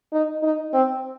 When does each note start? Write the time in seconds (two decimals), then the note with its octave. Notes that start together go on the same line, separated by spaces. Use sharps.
0.13 D#4
0.43 D#4
0.74 C4